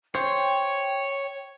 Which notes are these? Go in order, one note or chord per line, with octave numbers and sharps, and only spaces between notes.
C5 C#5 G5